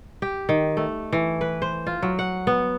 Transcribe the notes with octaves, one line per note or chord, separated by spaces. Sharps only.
G4
D#3
A3
E3
B4
C5
F4
F#3
F#5
B3